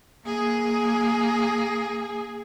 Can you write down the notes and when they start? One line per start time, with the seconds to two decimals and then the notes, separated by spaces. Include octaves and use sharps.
0.25 A#3 G#4